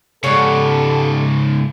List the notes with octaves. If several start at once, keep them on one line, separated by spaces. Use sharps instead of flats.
G#2 C#3 G4 A4 C#5 D5 F#5